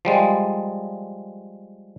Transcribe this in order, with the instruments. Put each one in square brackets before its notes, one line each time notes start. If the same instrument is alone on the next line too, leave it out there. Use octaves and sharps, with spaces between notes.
[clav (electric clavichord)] F3 G3 G#3